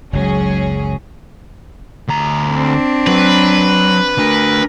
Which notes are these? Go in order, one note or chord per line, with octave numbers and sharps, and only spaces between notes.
F#1 C#2 F#3 C#4 G#4
D2 A#5
C4 D4
F#3 B4
A3 D4 A#4